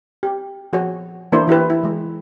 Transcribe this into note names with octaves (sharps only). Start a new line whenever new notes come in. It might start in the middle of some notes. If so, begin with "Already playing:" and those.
G4
F3 F#4 G#4 C#5
E3 A#3 D4 E4 C5
E3 E4 G4 B4
E4
E3 G#3